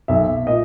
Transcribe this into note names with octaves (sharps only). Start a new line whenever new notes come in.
B1 E5
A#2 D#5